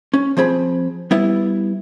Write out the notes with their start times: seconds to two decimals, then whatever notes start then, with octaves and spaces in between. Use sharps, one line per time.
0.13 C#4
0.37 F3 C4 G#4 B5
1.11 G3 B3 E4